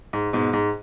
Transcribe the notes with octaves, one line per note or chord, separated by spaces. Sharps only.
G#2
G#2 B2
G#2